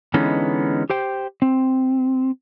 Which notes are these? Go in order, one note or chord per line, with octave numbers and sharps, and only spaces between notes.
D3 E3 G#3 B3 C#4 D#4
G4 C5 G5
C4